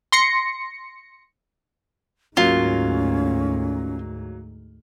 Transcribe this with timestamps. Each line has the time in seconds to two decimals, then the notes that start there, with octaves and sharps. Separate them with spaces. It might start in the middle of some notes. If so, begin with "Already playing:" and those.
0.12 C6 A#6 C#7
2.37 D2 G#2 F#3 A#3 C#4 F4